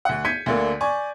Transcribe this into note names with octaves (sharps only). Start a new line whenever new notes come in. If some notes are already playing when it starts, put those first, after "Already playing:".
D2 F#5
G6 G#6 B6 C#7 D#7
D2 D3 A#3
D5 G#5 C#6